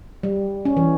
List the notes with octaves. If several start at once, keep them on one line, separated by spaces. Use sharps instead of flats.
G3
C#4
E3